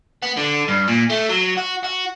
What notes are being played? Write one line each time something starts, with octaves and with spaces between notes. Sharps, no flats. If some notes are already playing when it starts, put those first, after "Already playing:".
B3
D3
G2
A#2
A3
F#3
F#4
F#4